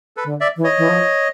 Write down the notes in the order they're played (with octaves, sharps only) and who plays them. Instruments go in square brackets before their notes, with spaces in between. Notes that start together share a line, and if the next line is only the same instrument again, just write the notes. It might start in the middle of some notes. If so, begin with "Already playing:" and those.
[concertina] A4 B4
[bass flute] D3
[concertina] D5 E5
[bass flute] E3
[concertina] C#5 D#5
[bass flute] E3
F3